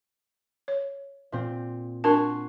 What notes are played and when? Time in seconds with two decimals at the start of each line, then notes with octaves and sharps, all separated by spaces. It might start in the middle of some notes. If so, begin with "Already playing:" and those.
0.68 C#5
1.32 A#2 C4
2.04 D4 F#4 A#4 A5 C6 G#6